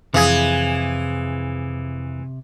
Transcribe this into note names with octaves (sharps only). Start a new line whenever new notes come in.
F2 C3 E3 G#4 F5 G#6